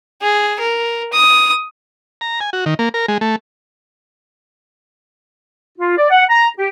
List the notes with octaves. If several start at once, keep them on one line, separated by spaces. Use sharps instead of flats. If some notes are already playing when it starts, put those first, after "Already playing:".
G#4
A#4
D#6
A#5
G#5
F#4
D#3
A#3
A#4
G#3
A3
F4
D5
F#5
A#5
G4